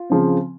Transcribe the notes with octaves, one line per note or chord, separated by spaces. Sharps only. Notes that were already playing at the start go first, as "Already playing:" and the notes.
Already playing: F4
C#3 F3 C4